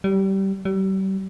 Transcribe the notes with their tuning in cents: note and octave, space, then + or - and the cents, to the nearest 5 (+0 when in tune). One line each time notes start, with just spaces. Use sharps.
G3 -20
G3 -35